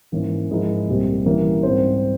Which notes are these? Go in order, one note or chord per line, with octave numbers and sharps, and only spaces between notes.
G#2 E3 A#3 C#4
G#2 F3 G#3 E4 A#4
C2 A#2 G3 C4 G4
E3 G3 A#3 C#4
G#2 G3 C4 G4 C5